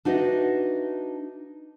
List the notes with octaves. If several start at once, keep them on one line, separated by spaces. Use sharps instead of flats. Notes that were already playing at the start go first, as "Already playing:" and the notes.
D4 D#4 F#4 B4 D#5 E5